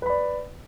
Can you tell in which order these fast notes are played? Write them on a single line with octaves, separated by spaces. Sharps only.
B4 B5 D5